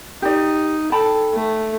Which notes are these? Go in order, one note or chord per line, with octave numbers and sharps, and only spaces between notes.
D#4 G4 D5
A4 G5 A5 B5
A3